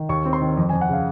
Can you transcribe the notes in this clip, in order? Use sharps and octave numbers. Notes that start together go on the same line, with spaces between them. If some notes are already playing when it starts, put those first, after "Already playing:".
Already playing: D#3
D#2 C#6
C4
C6
D#3
F2
F2 G#5
F#5
C#3 F5